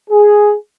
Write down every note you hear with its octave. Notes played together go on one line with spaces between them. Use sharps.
G#4